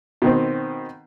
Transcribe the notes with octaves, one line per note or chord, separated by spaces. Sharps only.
B2 D#3 C4